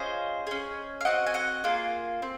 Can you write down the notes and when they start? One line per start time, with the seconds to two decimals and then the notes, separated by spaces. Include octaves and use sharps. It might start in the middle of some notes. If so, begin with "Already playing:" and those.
Already playing: C#4 F4 G#4 C5 D#5
0.47 C#4 G#4
1.01 F5
1.05 C4 F#4 D#5 F#5
1.27 G#5
1.34 D#5 F#5
1.64 A#3 F4 G#4
2.22 C4